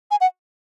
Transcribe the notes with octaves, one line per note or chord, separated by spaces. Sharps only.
G#5
F#5